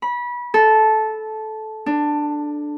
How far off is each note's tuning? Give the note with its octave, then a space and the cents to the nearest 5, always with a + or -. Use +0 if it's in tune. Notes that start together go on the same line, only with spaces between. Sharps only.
B5 -25
A4 -15
D4 +10